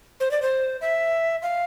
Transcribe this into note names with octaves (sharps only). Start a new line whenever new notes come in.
C5
D5
C5
E5
F5